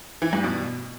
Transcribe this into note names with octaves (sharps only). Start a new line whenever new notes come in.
E3
G2
B2